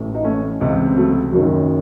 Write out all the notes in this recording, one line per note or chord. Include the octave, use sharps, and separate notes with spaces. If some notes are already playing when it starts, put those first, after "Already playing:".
Already playing: A1 A2 E3
D#4
A3 C#4
C#2 C3 E3 G#3 C4
C4
F#3 A3
F#1 F#2 D#3 F#3